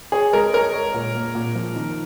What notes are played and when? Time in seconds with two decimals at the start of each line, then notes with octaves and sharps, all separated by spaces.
0.12 G#4 C#5
0.33 G#3 A#4
0.54 A#4 C#5
0.74 C#5
0.94 A#2
1.15 A#3
1.35 A#2
1.55 F3
1.76 D#3